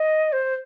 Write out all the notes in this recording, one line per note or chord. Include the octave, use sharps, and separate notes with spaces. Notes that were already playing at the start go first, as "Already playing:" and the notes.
Already playing: D#5
C5